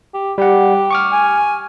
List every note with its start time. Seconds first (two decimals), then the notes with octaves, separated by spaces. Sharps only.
0.14 G4
0.38 G3 G4 F#5
0.91 C#6 D6 F6
1.12 G#5